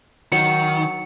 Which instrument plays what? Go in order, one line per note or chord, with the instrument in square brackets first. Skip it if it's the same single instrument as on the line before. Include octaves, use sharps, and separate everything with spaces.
[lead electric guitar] D#3 [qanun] F#3 [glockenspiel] C#7